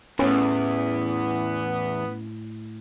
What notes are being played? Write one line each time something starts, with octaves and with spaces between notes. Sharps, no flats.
E2 A2 B3 C#4 B4